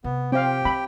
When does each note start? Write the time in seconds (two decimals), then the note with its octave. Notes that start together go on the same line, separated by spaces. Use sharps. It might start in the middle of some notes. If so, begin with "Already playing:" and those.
0.04 C3 B3
0.32 C4 G4 F5 G5
0.65 C4 B5